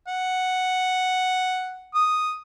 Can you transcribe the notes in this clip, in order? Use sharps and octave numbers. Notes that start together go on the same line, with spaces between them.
F#5
D#6